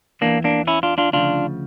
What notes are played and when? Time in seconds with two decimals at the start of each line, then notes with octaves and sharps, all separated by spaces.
0.21 E2 E3 A#3 D4
0.44 A#3 D4
0.67 C#4 E4
0.83 D4 F4
0.98 D4 F4
1.13 D2 C#3 F3 D4 F4